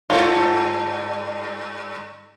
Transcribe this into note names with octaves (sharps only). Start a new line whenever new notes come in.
G2 F4 A4 C#5